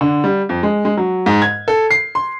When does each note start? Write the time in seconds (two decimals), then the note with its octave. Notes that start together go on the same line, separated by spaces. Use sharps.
0.01 D3
0.24 G3
0.49 F2
0.63 G#3
0.85 G#3
0.97 F#3
1.26 G#2
1.42 G#6
1.68 A4
1.91 C7
2.15 C6